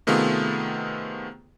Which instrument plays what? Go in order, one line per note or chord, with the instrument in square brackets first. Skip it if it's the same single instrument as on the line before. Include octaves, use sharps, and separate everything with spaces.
[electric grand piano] C3 D#3 A3 B3 F4 G#4